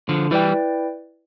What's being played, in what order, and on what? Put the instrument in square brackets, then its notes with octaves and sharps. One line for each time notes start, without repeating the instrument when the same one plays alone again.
[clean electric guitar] D3 F3
[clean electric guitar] E3 G3 [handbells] E4 B4 D5 G5